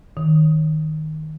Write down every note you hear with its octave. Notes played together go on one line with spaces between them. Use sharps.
D#3